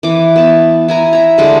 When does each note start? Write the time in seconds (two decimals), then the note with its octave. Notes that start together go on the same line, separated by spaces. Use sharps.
0.03 E3 D6
0.36 B3 A5
0.88 E4 G#5 A#5
1.13 E5 A#5
1.38 D3 G3 G#3 D4